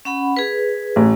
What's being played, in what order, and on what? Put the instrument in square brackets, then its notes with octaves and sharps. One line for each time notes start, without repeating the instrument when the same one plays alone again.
[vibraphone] C#4 F#5 B5
G#4 B4
[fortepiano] A1